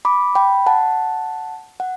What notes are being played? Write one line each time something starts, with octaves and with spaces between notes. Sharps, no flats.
B5 D6
G5 B5
F#5 A5
F#5